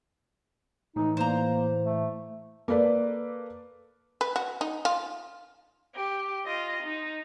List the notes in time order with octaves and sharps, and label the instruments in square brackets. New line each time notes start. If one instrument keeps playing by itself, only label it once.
[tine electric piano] A2 E3 [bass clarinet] D#4
[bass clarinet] A#3 [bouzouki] C5 A#5
[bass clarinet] A3
[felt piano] A#3 A4 B4 D5
[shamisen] B4
F#4
D#4
F4
[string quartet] G4
F4 D#5
D#4